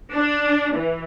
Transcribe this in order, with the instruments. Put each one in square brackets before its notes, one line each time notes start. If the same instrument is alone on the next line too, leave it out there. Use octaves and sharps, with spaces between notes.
[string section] D4
E3